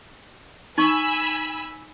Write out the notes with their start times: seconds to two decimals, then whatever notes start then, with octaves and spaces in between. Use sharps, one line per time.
0.78 D#4 G#5 B5 C#6 E6